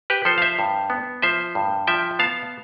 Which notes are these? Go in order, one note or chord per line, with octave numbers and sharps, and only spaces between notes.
G4 B4
F3 A4 C5
F5
C5 E5
G2
B3
F3 C5 E5
G2
F3 E5 G5
B3 F5 A5